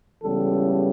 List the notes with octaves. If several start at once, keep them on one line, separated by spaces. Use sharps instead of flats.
C#2 C#3 E3 G3 B3 A4